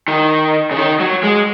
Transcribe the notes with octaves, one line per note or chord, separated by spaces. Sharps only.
D#3
C#3
D#3
F#3
G#3